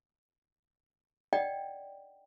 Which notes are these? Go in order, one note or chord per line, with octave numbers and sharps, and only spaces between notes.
D5 D#5 F#5 G5